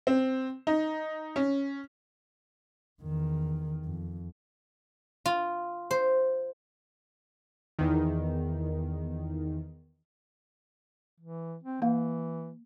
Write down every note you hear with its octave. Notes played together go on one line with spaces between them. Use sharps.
C4
D#4
C#4
E2 D#3
F2
F4
C5
E2 D#3
E3
C4
E3 A#3 F5